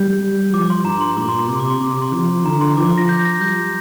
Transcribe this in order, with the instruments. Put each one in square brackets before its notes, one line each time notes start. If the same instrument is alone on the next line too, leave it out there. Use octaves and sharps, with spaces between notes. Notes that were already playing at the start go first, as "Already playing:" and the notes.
Already playing: [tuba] G3 [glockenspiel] G6
[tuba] F3 [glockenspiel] D6
[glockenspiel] C6
[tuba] G2 [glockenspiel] A#5
[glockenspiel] C6
[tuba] A#2 [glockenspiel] D6
[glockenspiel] C6
C6
[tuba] C3 [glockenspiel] D6
[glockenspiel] D6
C6
[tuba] C3 [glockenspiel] C6
[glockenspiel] D6
C6
[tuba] F3
[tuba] D3 [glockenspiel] A#5
[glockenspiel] C6
[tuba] F3 [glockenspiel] D6
[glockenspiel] A#6
G6
A#6
[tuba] G3 [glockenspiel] G6